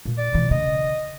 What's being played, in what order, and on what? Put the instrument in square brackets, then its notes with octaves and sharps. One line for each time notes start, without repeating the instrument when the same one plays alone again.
[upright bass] A#2
[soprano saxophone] D5
[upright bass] B2 E3
[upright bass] C#3 [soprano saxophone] D#5